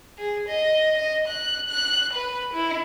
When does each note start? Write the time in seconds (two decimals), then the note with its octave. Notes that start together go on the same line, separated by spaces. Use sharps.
0.18 G#4
0.48 D#5
0.98 D#5
1.28 F#6
1.68 F#6
2.13 B4
2.53 E4